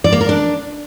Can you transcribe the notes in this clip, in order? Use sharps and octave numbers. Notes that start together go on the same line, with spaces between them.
D5
A#3
A#4
D4